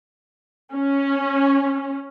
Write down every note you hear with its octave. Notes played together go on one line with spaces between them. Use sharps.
C#4